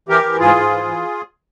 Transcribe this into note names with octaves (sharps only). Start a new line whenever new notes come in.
E3 G4 A#4
E3
G#2 F4 G#4
G#2
E3
E3